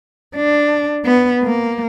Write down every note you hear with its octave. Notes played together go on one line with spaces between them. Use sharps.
D4
B3
A#3